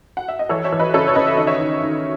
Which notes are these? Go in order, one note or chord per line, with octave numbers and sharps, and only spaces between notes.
F#5
E5
D#5
E3 A4 C#5
C#5 E5
E3
B4 D#5
C#3 A4 C#5
C#5
C#3 B4 D#5
E5
D#3 D#5
C#5 E5
D#3
D#3